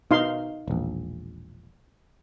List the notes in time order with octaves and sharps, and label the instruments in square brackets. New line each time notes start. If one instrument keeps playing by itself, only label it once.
[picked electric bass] B2 [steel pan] D#4 F5 C6
[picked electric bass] E1 A#1